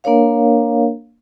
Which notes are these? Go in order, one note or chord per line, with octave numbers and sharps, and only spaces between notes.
A#3 D4 A#4 C#5 F5